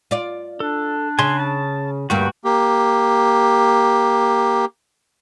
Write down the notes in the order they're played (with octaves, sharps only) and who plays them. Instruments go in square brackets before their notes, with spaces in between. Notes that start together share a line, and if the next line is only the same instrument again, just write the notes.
[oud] F4 D5
[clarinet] D4 [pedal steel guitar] A4
[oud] C#3 [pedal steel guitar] G#5 C6
[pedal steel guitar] A5
[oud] D2 G2 A#3 [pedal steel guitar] F#4 [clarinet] G5
[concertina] A#3 G4